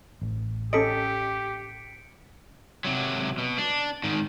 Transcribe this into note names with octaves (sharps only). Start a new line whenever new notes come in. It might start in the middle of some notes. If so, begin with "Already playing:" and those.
A1
C#4 G4 A4 D#5 B6 C#7 D7
C3 F#3
B2
D4
G#2 D#3